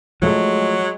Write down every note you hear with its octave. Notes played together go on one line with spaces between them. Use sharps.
F3 F#3 G#3 A3